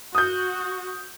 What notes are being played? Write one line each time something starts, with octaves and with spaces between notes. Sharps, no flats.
F#4 D#6 G6